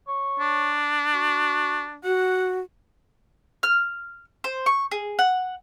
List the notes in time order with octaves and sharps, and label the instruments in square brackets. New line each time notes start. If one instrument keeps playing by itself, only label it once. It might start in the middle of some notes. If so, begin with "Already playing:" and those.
[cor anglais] C#5
[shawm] D4
[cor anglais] F#4
[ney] F#4 [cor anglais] F#5
[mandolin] F6
C5
C#6
G#4
F#5